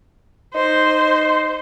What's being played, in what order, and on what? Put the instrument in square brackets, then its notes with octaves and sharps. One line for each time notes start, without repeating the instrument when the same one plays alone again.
[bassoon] D#4 [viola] C5